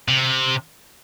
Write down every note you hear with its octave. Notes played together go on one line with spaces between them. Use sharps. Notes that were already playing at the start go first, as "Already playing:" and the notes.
C3